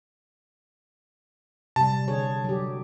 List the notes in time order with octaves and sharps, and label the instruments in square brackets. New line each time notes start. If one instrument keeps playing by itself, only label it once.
[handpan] C3 G3 [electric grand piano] A5
[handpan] D3 G#4 C#5
F#3 G4